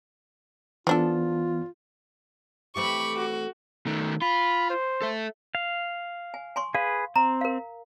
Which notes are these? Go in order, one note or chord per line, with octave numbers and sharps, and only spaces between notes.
E3 F3 B3 D4 F4 A4
E3 A3 C4 G4 B5 C#6 D6
F#4
D#3 A3
F4 B5
C5
A4 E5
F5
G#5
G#5 C6 C#6
G#4 B4 F5
C4 A#5
A#4 F5